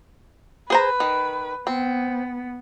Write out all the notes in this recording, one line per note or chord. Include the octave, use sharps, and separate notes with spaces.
G#4 B4 C5 A#5
D#3
B3 C4